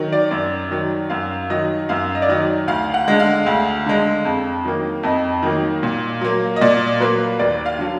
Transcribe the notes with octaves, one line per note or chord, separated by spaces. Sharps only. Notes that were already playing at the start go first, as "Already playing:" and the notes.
Already playing: D#3 F#3
D5
F#2
D#3 F#3
F#2 F5
D#3 F#3 D#5
F#2 F5
D#5
D5
D#3 F#3 D#5
D2 F5
F#5
D3 G#3
F5
D2
D3 G#3
F2
D#3 F#3 A#3
F2 D#5
D#3 F#3 A#3
A#2
F#3 A#3
D#5
A#2 D5
F#3 A#3 B4
D#2 D5
F5
D3 F#3